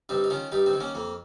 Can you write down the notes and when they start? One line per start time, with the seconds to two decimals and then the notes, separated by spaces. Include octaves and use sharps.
0.09 G2 C4 D#4
0.24 D#4
0.30 D#3 C#4 F4
0.52 G2 D#4 G4
0.66 C4 D#4
0.73 D#3
0.80 A#3 C#4
0.95 F2 A#3